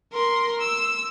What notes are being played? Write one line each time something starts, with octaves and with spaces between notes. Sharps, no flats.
A#4 C6
E6